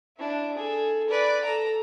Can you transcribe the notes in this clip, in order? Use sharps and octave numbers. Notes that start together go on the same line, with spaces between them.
D4 E4
G#4 A4
B4 D5
A4 A#5